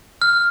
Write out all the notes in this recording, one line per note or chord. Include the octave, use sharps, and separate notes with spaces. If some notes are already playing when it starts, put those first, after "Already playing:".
F6